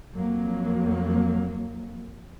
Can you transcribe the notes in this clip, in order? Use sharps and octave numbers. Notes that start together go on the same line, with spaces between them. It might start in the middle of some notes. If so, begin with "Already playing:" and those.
F2 F#3 A#3